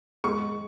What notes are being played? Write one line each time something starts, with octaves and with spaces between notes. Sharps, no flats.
G#3 C#6